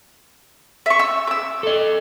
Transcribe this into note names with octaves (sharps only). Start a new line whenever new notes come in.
E5 C#6
E6
D6 E6
A4 D#5